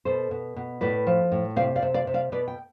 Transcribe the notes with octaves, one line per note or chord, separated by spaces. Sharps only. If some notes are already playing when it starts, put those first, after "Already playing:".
B2 A4 C5
B2
B2
A2 B4 D5
F3
A2
C3 D5 F5
D5 F5
C3
D5 F5
C3
D5 F5
B2 B4 D5
G5